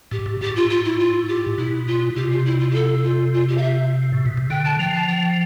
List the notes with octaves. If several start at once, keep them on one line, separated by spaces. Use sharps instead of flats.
A2 G4
A2
A2 G4
F4
F4
E4
F4
G4
B2 E4
F4
C3 G4
F4
E4
F4
G4
A4
F4
F4
G4
F5
E5
A2
B2
C3
D3 G5
A5
F3 G5
A5
G5